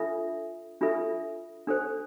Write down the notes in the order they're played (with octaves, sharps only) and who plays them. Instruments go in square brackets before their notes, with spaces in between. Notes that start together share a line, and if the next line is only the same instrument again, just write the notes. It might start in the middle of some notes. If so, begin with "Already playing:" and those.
Already playing: [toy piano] D4 F4 A4 E5
D4 F4 A4 E5
D4 A4 C5